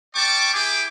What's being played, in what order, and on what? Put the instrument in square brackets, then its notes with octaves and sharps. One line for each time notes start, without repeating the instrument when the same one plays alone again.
[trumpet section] G3 D5 G5 A5 C#6 D6
E4 G4 G#4 G#5 D6